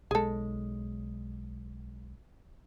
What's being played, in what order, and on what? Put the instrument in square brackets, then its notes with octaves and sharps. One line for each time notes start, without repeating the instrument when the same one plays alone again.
[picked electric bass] B1 G#3 [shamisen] G#4 A4